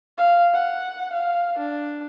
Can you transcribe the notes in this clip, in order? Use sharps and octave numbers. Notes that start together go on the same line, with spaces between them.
F5
F#5
F5
D4